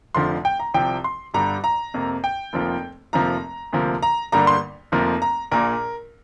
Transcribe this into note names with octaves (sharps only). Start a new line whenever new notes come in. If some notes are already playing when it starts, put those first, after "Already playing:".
F1 F2 D3 F3 C6
G5
A#5
C2 C3 F3 G5
C6
G1 G2 D3 G3 A#5
A#5
F2 C3 A#3
G5
F1 F2 F3 A#3
F1 F2 C3 F3 A#3 A#5
D2 C3 F3 A#3
A#5
G1 G2 D3 G3 A#3 A#5
C6
F1 F2 F3 A#3
A#5
A#1 A#2 A#3 A#4